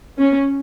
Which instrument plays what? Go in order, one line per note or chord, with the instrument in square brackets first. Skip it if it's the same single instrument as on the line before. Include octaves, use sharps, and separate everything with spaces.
[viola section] C#4